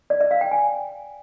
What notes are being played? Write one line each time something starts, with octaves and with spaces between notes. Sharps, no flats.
D5
E5
F5
G5
G#5